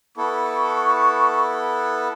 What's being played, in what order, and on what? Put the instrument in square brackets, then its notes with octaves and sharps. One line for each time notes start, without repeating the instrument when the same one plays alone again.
[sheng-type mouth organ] B3 E4 A4 [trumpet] C#6